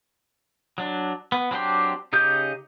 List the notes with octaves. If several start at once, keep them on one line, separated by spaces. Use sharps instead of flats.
F#3 D4
B3
F#3 C4 D4 G4 C6
C#3 D#4 G4 G6